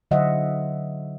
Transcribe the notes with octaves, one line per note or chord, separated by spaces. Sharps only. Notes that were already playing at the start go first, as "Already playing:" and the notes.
D3 F#3 C5 D#5 E5 F#5